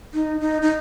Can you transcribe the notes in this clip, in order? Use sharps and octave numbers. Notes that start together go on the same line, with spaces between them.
D#4
D#4
D#4